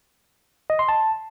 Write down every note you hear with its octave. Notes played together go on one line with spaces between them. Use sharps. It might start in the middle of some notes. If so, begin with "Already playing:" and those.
D#5
C6
A5